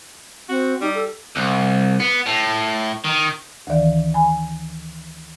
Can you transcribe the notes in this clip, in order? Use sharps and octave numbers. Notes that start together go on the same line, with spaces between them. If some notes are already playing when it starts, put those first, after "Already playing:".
C4 F#4
G3 D#4
A4
C2
B3
A2
D#3
D2 D#3 E3 D5 F5
G#5 B5